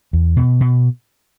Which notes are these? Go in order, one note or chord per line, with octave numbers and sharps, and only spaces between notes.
E2
B2
B2